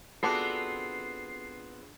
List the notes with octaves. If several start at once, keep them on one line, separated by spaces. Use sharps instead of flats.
B3 C4 D4 F4 F#4 G#4 A4 C7